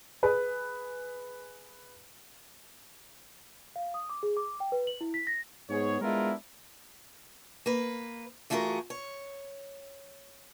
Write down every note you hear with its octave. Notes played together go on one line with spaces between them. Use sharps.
G#4 B4
F5
D#6
D6
G#4
D6
G5
B4
F#7
E4
B6
A#6
G#2 B3 G#4 C#5
G#3 B3 D4 E4 F4 A#4
A#3 B4
E3 A3 F4 F#4 G#4 A#4
C#5